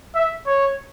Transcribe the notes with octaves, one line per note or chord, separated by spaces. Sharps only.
E5
C#5